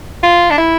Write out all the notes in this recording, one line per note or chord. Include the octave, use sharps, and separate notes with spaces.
F4
D4
E4